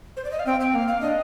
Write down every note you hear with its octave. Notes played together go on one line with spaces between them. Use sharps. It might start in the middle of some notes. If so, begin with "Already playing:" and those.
C5
D5
D#5
F5
C4 G5
G5
A#3 F5
F5
D4 D#5